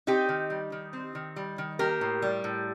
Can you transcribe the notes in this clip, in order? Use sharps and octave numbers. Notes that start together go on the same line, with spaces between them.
C4 D#4 G4
D#3
G3
D#3
C4
D#3
G3
D#3
A#3 G4 A#4
A2
G3
A2